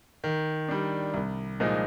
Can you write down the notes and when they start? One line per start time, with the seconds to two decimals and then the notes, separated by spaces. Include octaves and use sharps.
0.24 D#3
0.69 G3 D4
1.14 C2
1.60 A#2 F3 G#3 D#4